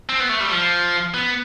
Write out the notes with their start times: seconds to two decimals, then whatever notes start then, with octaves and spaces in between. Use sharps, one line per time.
0.09 C4
0.20 B3
0.29 A3
0.40 G3
0.49 F3
1.14 B3